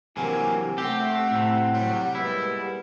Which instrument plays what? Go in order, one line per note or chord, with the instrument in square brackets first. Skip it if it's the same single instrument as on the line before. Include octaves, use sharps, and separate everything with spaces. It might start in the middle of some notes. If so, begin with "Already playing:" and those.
[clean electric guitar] C3 F#3 [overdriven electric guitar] E3 A#3 [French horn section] D4 G4 A#4 [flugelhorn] G#5
[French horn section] A3 [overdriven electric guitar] C4 [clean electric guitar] G4 [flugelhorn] F#5
[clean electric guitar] A2 C3
[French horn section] F#3 [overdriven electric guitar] G3
[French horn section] A#2 G#3 B3 [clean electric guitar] E4